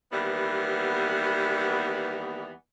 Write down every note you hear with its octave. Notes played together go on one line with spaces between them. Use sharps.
D#2 E3 G3 B3